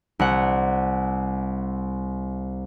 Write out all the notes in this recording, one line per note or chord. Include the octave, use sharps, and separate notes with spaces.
C2 F#5